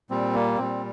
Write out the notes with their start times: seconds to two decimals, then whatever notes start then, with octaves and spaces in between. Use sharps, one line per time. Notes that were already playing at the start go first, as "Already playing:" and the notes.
0.10 A#2 G3 C4
0.35 A#3
0.58 A#2 G3 C4